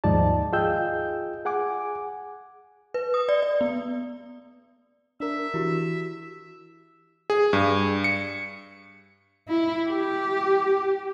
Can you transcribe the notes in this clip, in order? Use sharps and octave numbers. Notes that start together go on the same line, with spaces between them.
D#2 G#2 F3 D#4 D5 A5
F4 G#4 D#5 G5 E6 G6
G#4 F#5 G#5 D6
B4
D#6
D5
D5
B3
D4 A#4 E5
E3 E4 F#4 G4
G#4
G2
C#7
E4
G4